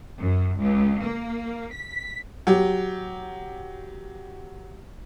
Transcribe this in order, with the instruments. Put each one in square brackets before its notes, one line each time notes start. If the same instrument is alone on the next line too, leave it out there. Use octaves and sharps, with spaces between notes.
[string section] F#2
C#2
A#3
B6
[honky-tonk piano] F#3 G4